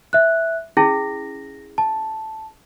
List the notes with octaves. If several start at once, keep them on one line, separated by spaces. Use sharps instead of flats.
E5 F#6
C#4 E4 G#4 A#6
A5